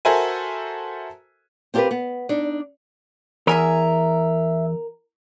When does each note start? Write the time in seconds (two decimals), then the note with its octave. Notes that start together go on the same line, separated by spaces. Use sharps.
0.05 F#4 A4 A#4 C5 E5 G#5
1.74 C4 F4 G4 G#4 A#4 B4
1.91 B3
2.29 D4 D#4
3.47 E2 A#4 E5 G#5 E6